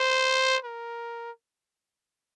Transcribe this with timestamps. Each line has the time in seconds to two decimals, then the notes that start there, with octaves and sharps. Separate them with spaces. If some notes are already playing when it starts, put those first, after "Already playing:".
Already playing: C5
0.64 A#4